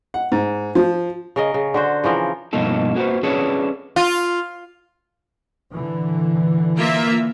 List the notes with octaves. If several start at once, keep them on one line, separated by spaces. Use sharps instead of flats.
F#5
G#2
F3
C#3 A#4 D#5
C#3
D3 F#4 C5
C#3 E3 F3 A#4
G2 B2 F3 A#3 D#4 A4
A#3 F#4 G4 B4 C5
C#4 D4 G#4 A4 B4 C#5
F4
A#2 D3 E3
A#3 F4 E5